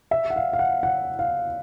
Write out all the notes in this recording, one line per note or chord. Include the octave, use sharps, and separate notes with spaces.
E5
F#5
F5
F5
F#5
F#5
F5